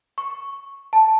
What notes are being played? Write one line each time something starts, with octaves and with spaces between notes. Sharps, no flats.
C#6
A5